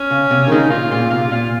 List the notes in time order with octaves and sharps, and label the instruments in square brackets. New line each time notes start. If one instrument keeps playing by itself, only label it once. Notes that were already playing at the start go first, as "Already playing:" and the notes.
Already playing: [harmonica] C#4
[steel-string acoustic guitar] C#3
C3
D#3
[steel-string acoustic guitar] C#3 [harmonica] G#3 D#4
[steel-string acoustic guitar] A#2 [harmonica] F4
[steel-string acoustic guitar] A#2 [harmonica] F4
[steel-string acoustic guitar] C3 [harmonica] F4
[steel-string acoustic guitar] A#2 [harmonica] F4